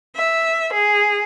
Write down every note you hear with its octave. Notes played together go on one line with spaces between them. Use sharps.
E5
G#4